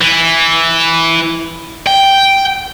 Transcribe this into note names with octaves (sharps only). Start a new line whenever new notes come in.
E3
G5